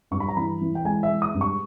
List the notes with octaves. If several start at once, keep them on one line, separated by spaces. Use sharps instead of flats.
G2 C#6
B5
A#5
E3 B5
E3
G5
G#3 G#5
E5
G#3
D#6
G2
C#6